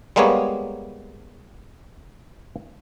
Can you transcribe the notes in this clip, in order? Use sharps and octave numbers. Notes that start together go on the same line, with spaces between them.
G3 G#3 A#3 B3 C#5